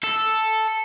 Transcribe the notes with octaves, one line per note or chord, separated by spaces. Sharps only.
A4